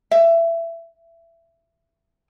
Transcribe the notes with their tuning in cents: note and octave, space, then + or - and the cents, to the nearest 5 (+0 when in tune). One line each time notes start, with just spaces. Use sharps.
E5 +20